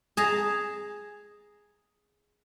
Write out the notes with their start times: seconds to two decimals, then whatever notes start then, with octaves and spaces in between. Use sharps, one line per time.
0.17 G#4 A5 A#5